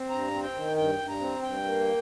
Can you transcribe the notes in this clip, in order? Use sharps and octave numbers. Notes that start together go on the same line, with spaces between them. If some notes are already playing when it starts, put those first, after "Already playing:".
Already playing: C4
G2 A#5
C4
G5
D#3
G2 G5
G2
A#5
C4
G2 G5
A#3